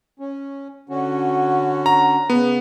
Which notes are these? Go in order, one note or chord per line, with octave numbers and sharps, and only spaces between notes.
C#4
D3 C#4 F#4
A#5
C#3 B3